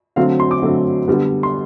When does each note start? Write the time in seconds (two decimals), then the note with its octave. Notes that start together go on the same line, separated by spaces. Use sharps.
0.16 D3 F#3 A3 C4 F5
0.40 C6
0.51 D6
0.62 D3 F#3 A3 C4
1.08 D3 G3 B3
1.43 C6